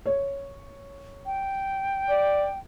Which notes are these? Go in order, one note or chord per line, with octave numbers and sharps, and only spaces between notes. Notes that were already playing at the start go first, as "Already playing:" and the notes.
C#5
G5
D5